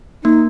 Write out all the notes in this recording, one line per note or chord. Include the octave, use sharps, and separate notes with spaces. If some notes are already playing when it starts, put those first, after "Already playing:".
A#3 D#4